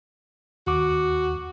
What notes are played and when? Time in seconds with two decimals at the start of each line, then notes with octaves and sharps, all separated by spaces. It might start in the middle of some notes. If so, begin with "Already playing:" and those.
0.67 D#2 F#4 D6